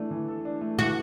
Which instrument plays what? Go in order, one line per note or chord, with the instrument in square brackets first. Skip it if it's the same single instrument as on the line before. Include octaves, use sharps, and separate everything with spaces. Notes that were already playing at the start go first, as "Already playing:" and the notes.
Already playing: [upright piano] E3 A3 D4
E3
A4
D4
A3
[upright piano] E3 [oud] F#4